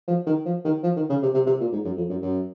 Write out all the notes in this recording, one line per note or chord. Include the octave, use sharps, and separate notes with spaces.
F3
D#3
F3
D#3
F3
D#3
C#3
C3
C3
C3
A#2
G#2
F#2
F2
F#2
F#2